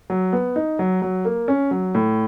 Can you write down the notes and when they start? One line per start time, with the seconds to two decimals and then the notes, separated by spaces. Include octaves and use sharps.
0.10 F#3
0.33 B3
0.56 D#4
0.79 F#3
1.02 F#3
1.25 A#3
1.48 C#4
1.71 F#3
1.95 A2